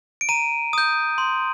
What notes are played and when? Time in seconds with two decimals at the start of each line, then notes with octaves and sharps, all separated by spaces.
0.21 D7
0.29 A#5 D#7
0.73 D#6 G6
1.18 C6